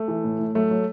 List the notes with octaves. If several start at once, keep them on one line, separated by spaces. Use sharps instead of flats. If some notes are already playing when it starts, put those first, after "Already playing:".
Already playing: A3
E3
A2
A2
F#3 A3
F#3